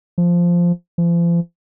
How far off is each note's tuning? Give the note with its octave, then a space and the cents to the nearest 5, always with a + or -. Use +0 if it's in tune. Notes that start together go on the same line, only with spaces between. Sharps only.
F3 -5
F3 -40